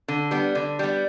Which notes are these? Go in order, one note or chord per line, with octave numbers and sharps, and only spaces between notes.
D3
G3 B3
D3
G3 B3